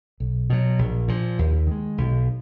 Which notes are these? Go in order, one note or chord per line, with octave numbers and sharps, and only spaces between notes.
B1
B2 F#3
A#1
A#2 F3
D#2
D#3 G#3
B1